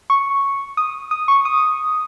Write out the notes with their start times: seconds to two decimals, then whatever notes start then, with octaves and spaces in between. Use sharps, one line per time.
0.10 C#6
0.77 D#6
1.11 D#6
1.28 C#6
1.45 D#6